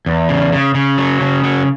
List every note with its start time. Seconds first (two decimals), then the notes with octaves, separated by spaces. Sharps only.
0.06 E2
0.29 C#3
0.52 C#3
0.74 C#3
0.98 F#3
1.21 C#3
1.44 F#3